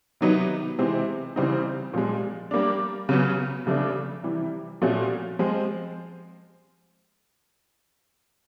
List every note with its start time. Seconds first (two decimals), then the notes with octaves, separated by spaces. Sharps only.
0.21 C3 D#3 F#3 B3 D#4
0.79 C3 E3 G#3 C4
1.36 C#3 E3 G3 C4 D#4
1.94 A#2 F3 G#3
2.51 G3 A#3 D4
3.09 C#3 F#3 B3
3.67 C#3 F3 A3 D4
4.23 C3 E3 G3
4.82 A#2 F3 A3 C#4 F#4
5.39 F3 G#3 C4